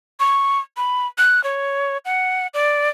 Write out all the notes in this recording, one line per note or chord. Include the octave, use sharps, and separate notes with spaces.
C#6
B5
F#6
C#5
F#5
D5